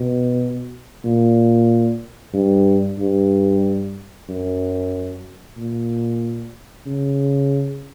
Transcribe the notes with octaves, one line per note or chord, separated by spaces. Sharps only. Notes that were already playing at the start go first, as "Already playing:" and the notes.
Already playing: B2
A#2
G2
G2
F#2
A#2
C#3